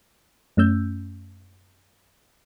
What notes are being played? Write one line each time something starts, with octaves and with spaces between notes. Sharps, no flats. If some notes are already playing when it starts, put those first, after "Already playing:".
F#2 A3 C#4 E6 G6